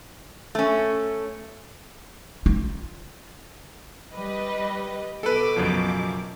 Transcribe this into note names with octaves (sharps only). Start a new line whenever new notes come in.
A3 C#4
F4
G3 B4 D#5
B2 A4 B4 D6
F#2 C#3 F3